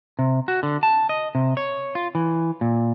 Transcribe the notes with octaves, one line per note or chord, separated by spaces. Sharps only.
C3
F#4
D3
A5
D#5
C3
C#5
F4
E3
A#2